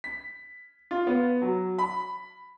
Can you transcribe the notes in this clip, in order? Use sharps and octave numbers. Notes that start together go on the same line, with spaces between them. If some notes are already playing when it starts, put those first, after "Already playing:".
B6
F4
B3
F#3
B5